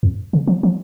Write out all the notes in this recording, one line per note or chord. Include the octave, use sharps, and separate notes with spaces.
F2
C#3
F3
F3